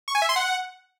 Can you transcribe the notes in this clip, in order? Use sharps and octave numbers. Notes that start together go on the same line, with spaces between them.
C#6
G#5
E5
C6
F#5